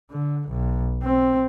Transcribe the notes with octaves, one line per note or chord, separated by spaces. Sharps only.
D3
B1
C4